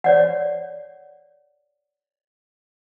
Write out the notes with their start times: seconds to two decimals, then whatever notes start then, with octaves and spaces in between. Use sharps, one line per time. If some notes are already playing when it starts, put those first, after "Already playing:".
0.04 C#5 D5 F#5